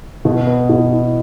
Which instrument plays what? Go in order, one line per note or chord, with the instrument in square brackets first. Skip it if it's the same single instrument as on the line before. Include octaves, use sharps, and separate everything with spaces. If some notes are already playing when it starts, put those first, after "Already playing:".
[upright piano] B2
B3
B2
E4